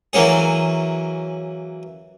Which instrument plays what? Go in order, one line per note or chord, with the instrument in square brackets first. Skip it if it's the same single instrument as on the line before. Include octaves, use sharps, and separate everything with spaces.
[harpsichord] E3 F#3 A#3 C#4 G#4